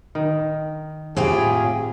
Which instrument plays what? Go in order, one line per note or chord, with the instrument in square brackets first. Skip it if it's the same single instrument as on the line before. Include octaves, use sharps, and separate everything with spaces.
[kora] D#3
[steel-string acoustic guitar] A2 F4 G4 [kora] C4 [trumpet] G#4